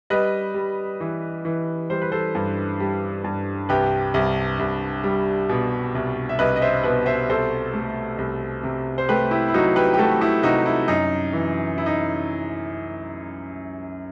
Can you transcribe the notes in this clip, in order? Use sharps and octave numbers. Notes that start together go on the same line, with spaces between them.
G3 B4 D#5
G3
E3
E3
G3 C5
B4
A4 C5
G2
G3
G2
C2 G4 B4
C2
C2
G3
B2
C2
E5
C2 B4 D#5
D#5
C5 E5
B2 B4 D#5
C5 E5
C2 A4 C5
A3
C2
C3
C5
A3 G4 B4
E4 G4
E4
F#3 D#4 F#4
G4 B4
G4
A3 F#4 A4
E4 G4
C3 D#4 F#4
E4
F#2 D#4
E3
E4
D#4